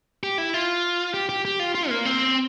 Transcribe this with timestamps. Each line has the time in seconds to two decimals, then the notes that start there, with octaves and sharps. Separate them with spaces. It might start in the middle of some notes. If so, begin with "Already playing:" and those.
0.23 G4
0.38 E4
0.54 F4
1.14 G4
1.29 G4
1.45 G4
1.60 F4
1.75 F4
1.89 A#3
2.05 C4